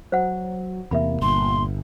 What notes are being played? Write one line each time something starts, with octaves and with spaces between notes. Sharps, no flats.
F#3 C5 F#5
E2 C3 A#3 E5 B5
G1 A#2 C6